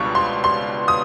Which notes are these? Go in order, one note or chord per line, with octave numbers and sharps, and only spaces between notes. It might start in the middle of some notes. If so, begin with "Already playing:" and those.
Already playing: C#2 B2 G3 B3 D4 C#6
C6
C6
D#6